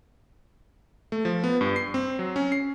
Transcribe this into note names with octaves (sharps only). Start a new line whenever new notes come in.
A3
F3
B3
G2
C7
C4
F#3
C#4
C7